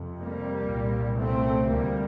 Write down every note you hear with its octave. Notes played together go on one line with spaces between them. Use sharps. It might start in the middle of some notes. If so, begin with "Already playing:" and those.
Already playing: F2 C3
G3 A#3
C2 A#2
A3 C4
D2 C3 G3 A#3